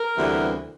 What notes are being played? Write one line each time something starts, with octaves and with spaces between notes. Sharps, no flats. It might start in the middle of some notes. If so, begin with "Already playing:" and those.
Already playing: A#4
D2 C3 E3 G3 B3